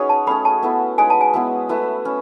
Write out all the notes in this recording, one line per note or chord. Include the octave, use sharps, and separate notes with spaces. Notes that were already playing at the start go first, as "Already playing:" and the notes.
Already playing: C#4 D#4 F#4 G#4 B4 C#5 D#5
A5
A3 C#4 G#4 B5
A5
B3 E4 A4
G#3 D#4 G#4 B4 G#5
A5
G#5
G#3 B3 E4
A3 E4 B4
C#4